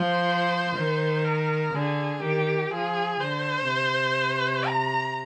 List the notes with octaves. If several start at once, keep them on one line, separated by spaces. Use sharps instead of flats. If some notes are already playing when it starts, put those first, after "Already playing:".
Already playing: F3 C5
D#3
A#4
D3 G#4
D#3 G4
F3 G#4
D3 C5
C3
A#5